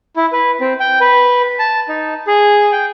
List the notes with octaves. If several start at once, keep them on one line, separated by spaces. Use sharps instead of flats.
E4
B4
C4
G5
B4
A5
D#4
G#4
G5